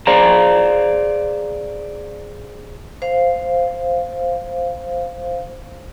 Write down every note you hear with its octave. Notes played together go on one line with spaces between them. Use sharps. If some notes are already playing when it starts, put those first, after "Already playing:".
G#4 C5 D5 F5 A#5
C5 F5